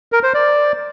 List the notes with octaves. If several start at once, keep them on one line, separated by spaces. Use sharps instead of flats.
A#4
C5
D5